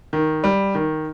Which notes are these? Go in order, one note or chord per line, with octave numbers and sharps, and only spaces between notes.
D#3
G3
D#3